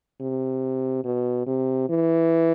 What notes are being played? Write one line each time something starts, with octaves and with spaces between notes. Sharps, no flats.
C3
B2
C3
E3